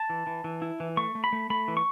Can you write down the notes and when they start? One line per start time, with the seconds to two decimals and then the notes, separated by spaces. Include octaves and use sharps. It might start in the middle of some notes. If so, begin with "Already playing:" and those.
Already playing: A5
0.10 E3
0.27 E3
0.44 E3
0.62 E4
0.80 E3
0.97 A3 C#6
1.15 A3
1.24 B5
1.33 A3
1.50 A3 B5
1.68 E3
1.77 C#6